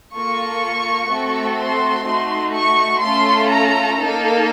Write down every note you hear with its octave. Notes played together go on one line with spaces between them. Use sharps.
A#3 F4 A4 C#6
A3 C4 F#4 A4
C6
A3 D#4 F#4
C#6
A3 C#4 F4 A4 C6
A#5
A#3 D#4 A4